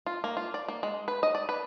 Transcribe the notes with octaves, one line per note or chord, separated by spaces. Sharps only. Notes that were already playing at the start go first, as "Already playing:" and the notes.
F4
A#3
F4
D5
A#3
G#3
B4
D#5
D5
B4